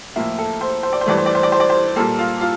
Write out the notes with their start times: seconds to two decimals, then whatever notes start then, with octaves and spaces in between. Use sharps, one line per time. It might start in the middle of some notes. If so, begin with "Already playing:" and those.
0.16 A2 F3 A#3 E4
0.38 A4
0.61 C5
0.83 C5
0.93 D5
1.01 C5
1.06 G2 E3 A3 D5
1.18 C5
1.26 D5
1.35 C5
1.43 D5
1.52 C5
1.60 D5
1.70 C5
1.96 A#2 G3 A#3 A4
2.19 F4
2.41 F4